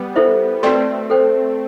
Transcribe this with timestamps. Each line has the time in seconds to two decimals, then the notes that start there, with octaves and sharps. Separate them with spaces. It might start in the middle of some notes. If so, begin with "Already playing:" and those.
Already playing: G3 B3
0.16 E4 A4 C5 E5
0.63 A3 C4 F#4 B4 D5 G5 C6
1.10 A4 C5 G5